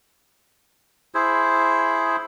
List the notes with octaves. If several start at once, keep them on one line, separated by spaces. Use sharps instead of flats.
E4 G#4 C5